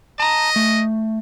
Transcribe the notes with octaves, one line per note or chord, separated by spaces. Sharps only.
D#5 A5 A#5
A3